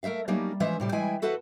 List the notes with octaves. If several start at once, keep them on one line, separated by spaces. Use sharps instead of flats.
A3 A#4 C5 E5 F5
F#3 G3 A3 A#3 C#4 D#4
E3 F3 G#3 C#4 C5 E5
A2 C3 G3
E3 G#3 E4 E5 G5 G#5
F#4 A4 B4 C5 E5 F#5